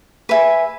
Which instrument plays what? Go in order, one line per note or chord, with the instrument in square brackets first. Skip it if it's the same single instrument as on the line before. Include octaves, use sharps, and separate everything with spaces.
[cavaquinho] B4 E5 G#5